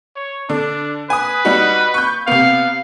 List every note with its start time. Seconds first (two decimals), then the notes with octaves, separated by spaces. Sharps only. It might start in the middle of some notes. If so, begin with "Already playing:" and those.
0.16 C#5
0.49 D3 D4
1.10 B4 G#5 D#6
1.45 G3 D#4 F#4
1.94 C#6 G6
2.28 C3 B3 F5